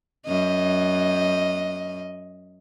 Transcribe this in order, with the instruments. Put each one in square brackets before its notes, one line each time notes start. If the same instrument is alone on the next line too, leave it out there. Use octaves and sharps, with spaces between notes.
[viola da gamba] F#2 D#5